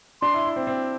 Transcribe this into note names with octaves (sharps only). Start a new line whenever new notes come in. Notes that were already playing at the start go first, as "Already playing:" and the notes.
D4 C6
E4
E4
C4
C4